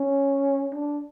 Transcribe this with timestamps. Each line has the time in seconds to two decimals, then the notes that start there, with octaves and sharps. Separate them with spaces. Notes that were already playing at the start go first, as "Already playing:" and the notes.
Already playing: C#4
0.73 D4